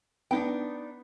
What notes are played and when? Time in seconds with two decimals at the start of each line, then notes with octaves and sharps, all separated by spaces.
0.31 B3 D4 D#4 G5